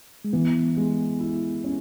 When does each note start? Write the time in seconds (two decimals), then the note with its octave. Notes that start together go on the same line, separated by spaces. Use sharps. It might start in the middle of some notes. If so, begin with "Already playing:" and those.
0.24 G#3
0.33 E3 B3
0.77 G#3
1.20 E4
1.64 C#4